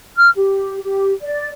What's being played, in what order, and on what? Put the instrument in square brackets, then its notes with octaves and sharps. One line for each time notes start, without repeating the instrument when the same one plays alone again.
[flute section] F6
G4
G4
D5